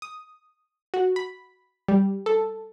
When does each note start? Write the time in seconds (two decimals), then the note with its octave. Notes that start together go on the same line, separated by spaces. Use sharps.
0.02 D#6
0.94 F#4
1.16 B5
1.88 G3
2.26 A4